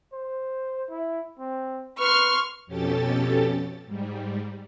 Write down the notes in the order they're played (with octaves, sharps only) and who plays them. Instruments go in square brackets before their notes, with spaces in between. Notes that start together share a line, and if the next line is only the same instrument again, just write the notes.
[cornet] C5
E4
C4
[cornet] B4 [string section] C6 C#6 F6
[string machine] F2 B2 C#4 G4 A4 A6
G#2 G3